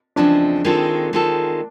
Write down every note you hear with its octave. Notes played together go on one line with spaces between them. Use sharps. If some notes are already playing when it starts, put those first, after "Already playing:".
E2 C#3 F3 G#3 C4 D4
D#3 G#3 C4 F4 A4
D#3 G#3 C4 F4 A4